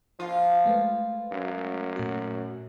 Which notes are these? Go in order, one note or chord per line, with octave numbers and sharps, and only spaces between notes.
F3 F4
G#3 A3 B4
F#2
A#2 A3 F#4